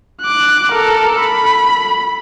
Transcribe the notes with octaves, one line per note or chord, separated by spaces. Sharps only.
D6 F#6
A4 A#4
B5